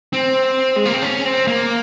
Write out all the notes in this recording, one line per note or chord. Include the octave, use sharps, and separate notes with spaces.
C4
G#3
A#3
C4
C#4
C4
A#3